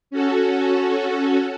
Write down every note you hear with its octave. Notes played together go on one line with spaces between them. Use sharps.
C#4 F#4 A4